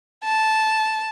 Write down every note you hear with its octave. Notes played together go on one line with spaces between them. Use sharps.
A5